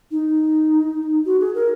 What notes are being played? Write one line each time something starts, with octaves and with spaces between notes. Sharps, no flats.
D#4
F#4
G#4
A#4